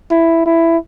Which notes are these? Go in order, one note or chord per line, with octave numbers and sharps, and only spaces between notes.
E4
E4